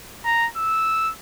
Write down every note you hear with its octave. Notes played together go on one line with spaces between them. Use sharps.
A#5
E6